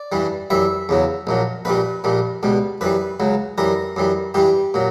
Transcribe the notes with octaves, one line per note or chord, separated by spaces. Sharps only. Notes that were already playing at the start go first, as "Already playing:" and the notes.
Already playing: D5
G2 E3 G3
F#2 E3 G3 E5
E2 C#3 F#3
A#1 A#2 F#3
A#1 A#2 G3 B4
A#1 A#2 G3
C#2 B2 G3
F#2 E3 G3 B4
C#2 C#3 F#3
F#2 E3 G3 A#4
F#2 E3 G3
G2 E3 G3 G4
A#2 F#3